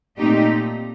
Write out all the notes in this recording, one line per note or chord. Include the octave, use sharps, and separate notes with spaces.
A#2 A3 C4 D#4 G4